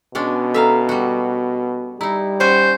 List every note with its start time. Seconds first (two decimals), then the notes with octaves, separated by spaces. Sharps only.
0.15 B2 G#3 C#4 D4
0.54 A4 E5 F5 A#5
0.89 G3 F#4
2.01 G3 D#4 E4 A#5
2.40 C#4 F#4 C5 G#5